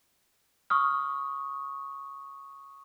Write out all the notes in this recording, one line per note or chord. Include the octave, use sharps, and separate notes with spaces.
C#6 D#6 F6